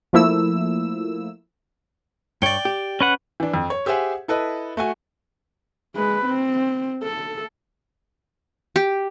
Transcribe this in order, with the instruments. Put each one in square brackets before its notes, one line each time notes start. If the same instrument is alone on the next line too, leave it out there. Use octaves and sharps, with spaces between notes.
[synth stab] F3 A3 A#3 E4 E6
[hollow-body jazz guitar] G2 C#5 [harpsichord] D5 G5
[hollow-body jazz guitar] G4
[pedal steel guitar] C#4 B4 F#5
[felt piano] E3 D4
F2
C#5
G4 G#4 C5 E5 F#5 G#5
E4 A4 B4 D#5
A3 F#4 G#5
[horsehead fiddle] G#3 B4
C4
A4
[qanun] G4